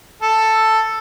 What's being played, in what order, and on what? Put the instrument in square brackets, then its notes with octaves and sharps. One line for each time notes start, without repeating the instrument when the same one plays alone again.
[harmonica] A4